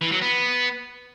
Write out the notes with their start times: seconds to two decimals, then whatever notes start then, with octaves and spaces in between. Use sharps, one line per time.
0.01 E3
0.11 F#3
0.22 B3